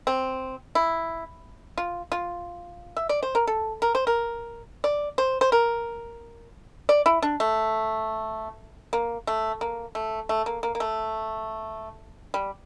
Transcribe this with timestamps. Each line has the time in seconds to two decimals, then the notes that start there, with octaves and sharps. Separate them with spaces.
0.07 C4
0.75 E4
1.78 F4
2.12 F4
2.97 E5
3.09 D5
3.23 C5
3.35 A#4
3.47 A4
3.82 A#4
3.95 C5
4.07 A#4
4.84 D5
5.18 C5
5.41 C5
5.52 A#4
6.89 D5
7.06 E4
7.22 D4
7.40 A3
8.93 A#3
9.27 A3
9.61 A#3
9.95 A3
10.29 A3
10.46 A#3
10.63 A#3
10.75 A#3
10.80 A3
12.34 G3